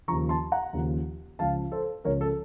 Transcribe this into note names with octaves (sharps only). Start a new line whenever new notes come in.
D#2 C#3 F3 A#5 C#6
A5 C6
F#5 A#5
D#2 C#3 F3
C#2 C#3 F3 F5 A5
A4 C5
C#2 C#3 F3 A#4 C#5
A4